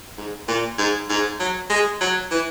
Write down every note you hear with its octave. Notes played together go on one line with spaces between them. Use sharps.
G#2
A#2
G#2
G#2
F#3
G#3
F#3
E3